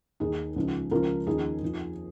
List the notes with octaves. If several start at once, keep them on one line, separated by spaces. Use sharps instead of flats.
D#2 D#3 D#4 G#4
C#2 C#3 F3
C#2 C#3 F3 F4 A#4
D#2 C#3 F3 D#4 G#4
F2 F3